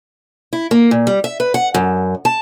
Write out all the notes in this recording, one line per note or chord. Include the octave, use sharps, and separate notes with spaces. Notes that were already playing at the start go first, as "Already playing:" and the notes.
E4
A#3
A#2
G3
E5
B4
F#5
F#2
A5